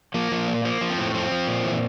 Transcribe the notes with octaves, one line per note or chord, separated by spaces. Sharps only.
F3 A#3
F3
A#2
F3 A#3
F3
C4
A2
F3 C4
F3
A#2
E3